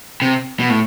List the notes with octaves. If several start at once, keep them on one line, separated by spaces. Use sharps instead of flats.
C3
B2
A2